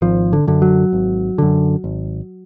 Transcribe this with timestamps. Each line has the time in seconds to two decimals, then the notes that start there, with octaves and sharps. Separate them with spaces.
0.02 G#1 F3
0.33 D3
0.47 F#2 D3
0.62 F#3
0.93 G#1
1.38 F#2 D3
1.84 G#1